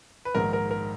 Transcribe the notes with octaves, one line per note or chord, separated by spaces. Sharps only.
B4
A#1 G#2 D#3 A#4
A#4
A#4